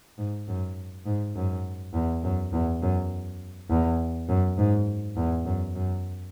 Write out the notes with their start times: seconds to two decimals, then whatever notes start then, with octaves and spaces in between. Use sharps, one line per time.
0.18 G#2
0.48 F#2
1.06 G#2
1.36 F#2
1.94 E2
2.24 F#2
2.52 E2
2.82 F#2
3.69 E2
4.29 F#2
4.58 G#2
5.17 E2
5.45 F#2
5.75 F#2